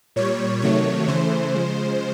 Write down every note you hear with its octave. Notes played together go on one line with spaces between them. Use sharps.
A#2 G3 C#5
C3 D#3 F#3 A3 C#5
C#3 E3 A3 C5
C#3 F3 G#3